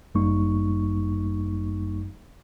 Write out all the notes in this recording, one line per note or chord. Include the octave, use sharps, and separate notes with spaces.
G1 F#2 G3 A#3 D#4 C#6